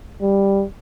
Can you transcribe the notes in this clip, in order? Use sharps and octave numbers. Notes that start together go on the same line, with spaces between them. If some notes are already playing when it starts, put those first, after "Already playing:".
G3